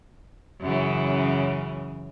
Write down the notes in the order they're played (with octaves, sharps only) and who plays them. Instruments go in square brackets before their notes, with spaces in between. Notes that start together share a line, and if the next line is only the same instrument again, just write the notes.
[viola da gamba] F#2 C#3 E3